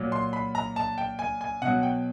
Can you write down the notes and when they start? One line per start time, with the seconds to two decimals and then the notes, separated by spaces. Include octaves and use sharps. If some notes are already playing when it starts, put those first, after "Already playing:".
Already playing: A#2 F#3
0.12 C6
0.33 B5
0.55 A#5
0.76 A5
0.98 G5
1.19 G#5
1.41 G#5
1.62 B2 F#3 F#5
1.83 G5